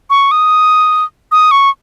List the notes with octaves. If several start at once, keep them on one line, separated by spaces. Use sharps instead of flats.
C#6
D#6
D#6
C#6